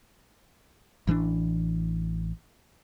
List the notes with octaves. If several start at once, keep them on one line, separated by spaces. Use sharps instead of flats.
A1 E3 G#3 D4